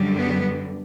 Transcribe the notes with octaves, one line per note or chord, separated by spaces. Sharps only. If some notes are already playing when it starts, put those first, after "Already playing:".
Already playing: F#2 D3 G3
B3